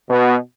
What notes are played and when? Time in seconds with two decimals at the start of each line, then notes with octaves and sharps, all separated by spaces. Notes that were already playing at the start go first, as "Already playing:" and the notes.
0.10 B2